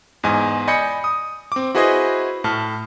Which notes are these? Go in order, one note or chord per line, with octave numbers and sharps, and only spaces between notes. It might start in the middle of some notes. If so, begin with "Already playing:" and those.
E2 G#2 D#5 G#5
D5 D#5 G#5 B5 G6 C#7
D#6
C4 D6
E4 F#4 G#4 B4 C5 D#5
A2 A5 F6